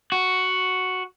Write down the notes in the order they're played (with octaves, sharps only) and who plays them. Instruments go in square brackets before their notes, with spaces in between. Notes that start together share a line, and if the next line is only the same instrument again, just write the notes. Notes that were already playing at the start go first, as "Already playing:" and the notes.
[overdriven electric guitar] F#4